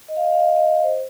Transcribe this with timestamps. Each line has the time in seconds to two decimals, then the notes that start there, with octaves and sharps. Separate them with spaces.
0.08 D#5
0.16 F5
0.24 D#5
0.32 F5
0.40 D#5
0.49 F5
0.56 D#5
0.66 F5
0.74 D#5
0.83 C5